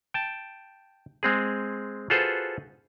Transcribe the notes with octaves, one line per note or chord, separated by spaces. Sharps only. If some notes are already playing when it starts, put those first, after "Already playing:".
G5 A5
G#3 C4 G#4
F4 F#4 G#4 A4 B4 C5